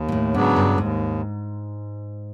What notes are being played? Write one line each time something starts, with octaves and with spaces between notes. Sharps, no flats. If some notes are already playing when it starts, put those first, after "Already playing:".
Already playing: D#2
A#2
A2
G#2 C#3 F#3 B3 D4
G2
D#2 G#2